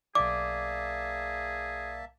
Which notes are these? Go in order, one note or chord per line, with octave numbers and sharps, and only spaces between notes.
B1 A#3 G#4 D5 E5 A5 D6